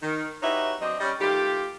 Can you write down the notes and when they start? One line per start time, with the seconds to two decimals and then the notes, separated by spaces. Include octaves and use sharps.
0.02 D#3
0.42 D#4 F#4 G4 B4 C#5 E5
0.81 F#3 C4 D4 D#5
0.99 G3 C#4 D#5
1.20 D#3 A3 F4 G4